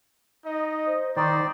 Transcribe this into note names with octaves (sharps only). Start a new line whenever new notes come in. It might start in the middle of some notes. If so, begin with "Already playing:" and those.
D#4 D#5
C5
D#3 D#4 C5 D5 D#6